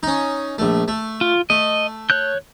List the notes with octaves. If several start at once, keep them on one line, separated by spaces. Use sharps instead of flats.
C#4 D#4
A#1 A3
A3
F4
A3 D#5
C#5 F#6 G6